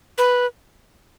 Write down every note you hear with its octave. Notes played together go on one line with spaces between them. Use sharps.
B4